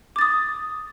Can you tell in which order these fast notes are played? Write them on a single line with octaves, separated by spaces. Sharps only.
D6 A6 D#6